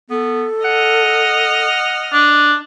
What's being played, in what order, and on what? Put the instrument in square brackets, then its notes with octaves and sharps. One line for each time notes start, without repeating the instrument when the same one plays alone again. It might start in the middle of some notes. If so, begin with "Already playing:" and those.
[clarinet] B3 [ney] A4
[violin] D#5 F6 [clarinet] F#5
[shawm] D4